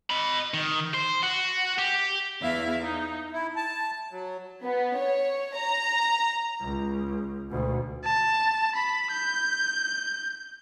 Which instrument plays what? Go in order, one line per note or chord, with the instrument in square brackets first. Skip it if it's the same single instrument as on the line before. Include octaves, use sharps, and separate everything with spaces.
[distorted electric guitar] D#5 B5
D#3
C5
F#4
G4
[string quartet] E2 E4 E5 F5
D#4
[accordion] E4
A5
F#3
[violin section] B3
C#5
A#5
[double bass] C#2
D2 B2
[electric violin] A5
B5
G6